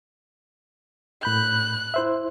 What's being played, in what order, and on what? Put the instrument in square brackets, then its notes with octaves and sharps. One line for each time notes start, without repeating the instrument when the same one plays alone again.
[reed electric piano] A2 B5 G6 [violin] F#6
[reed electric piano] E4 C5 E5